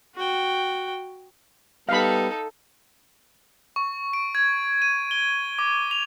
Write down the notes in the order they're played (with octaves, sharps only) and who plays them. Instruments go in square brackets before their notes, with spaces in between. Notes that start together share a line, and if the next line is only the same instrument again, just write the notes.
[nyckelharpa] F#4 G5
[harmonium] G3 B3 [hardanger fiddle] D#4 A4 [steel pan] F5 B5
[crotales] C#6
D7
G#6
D#7
G7
D6
F7